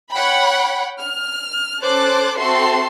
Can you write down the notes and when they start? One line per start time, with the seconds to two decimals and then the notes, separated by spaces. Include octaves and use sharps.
0.12 C#5 F#5 G5 B5
0.99 F6
1.82 C#4 A4 C5 D6 F#6 A6
2.38 C4 F#4 A4 E5 C6 C7